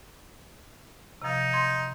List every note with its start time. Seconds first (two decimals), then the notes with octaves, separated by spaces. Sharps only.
1.22 C3 F3 D#4
1.53 C6 G#6